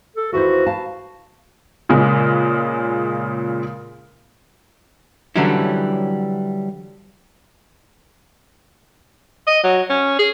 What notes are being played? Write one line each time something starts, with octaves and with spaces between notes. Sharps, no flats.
A4
D#2 E3 F#4 C5
B4 F5 A5
A#2 C#3 G#3
D3 E3 F#3 G3 C#4 E4
D#5
F#3
C#4
G#4